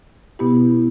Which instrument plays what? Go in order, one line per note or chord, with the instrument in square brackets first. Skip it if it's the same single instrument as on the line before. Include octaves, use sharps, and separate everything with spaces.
[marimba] B2 B3 E4 G4